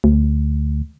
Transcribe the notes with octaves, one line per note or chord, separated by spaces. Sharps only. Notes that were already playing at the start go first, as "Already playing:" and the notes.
D2